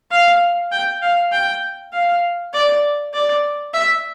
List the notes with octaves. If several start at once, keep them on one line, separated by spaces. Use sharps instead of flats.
F5
G5
F5
G5
F5
D5
D5
E5